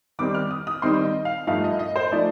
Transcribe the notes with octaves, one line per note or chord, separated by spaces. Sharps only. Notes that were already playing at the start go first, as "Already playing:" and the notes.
D#3 G3 C4 D#4 D6
F6
D#6
D#6
D#3 G3 C4 D#4 C6
D#5
F5
G2 F3 A3 D#4 F5
D#5
D#5
C5
F3 A3 D#4 D5